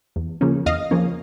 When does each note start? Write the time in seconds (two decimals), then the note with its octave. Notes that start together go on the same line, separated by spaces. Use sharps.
0.16 E2
0.41 C#3 F3 A#3 C#4
0.66 E2 D#5 F5
0.91 C#3 F3 A#3 C#4